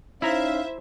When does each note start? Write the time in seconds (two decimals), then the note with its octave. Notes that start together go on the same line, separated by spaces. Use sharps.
0.22 C#4 D#4 E4 C5 E5 F5 A#5